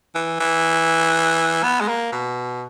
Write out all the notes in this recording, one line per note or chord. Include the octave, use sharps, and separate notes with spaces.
E3
E3
B3
G#3
A#3
B2